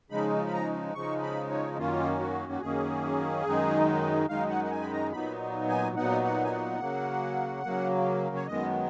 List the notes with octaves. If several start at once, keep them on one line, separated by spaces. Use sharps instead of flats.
C#3 F3 G#3 D#4 B5
B5
A#5
C#3 F3 G#3 D#4 C#6
B5
C#5
F#2 D#3 A#3 C#4 F4
F#4
F#4
F#2 D#3 A#3 C#4 G#4
F#2 D#3 G#3 D#4
F#2 D#3 G#3 D#4 F5
F#5
F#5
G#5
B5
A#5
A#2 F#3 B3 D#4 B5
G#5
A#2 F#3 B3 D#4 F#5
F#5
G#5
F#5
C#3 F#3 A#3
C#3 F#3 A#3
C#5
F#2 D#3 G#3 B3 D#5